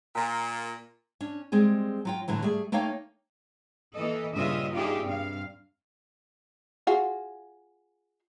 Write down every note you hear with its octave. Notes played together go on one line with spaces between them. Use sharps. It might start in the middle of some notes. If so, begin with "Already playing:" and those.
A#2
C#4 D4
G3 G#3 C4 G#4
F#3 F4 G5
A2 D3 E3 F#3
G3 A3 G#4
A3 A#3 D#4 C#5 F5 G5
E3 A#3 A4 D#5
G2 A#2 C#3 F4 D#5 E5
D#4 F4 G4 G#4 D5 E5
G2 C3 F5
F4 F#4 G#4